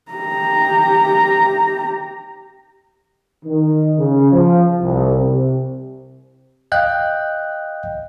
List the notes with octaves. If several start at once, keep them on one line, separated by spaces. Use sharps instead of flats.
G4 A#5
D#3
C#3
F3
C2
C3
D#5 F5 G5 F#6 G6